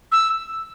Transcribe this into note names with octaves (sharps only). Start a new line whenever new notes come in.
E6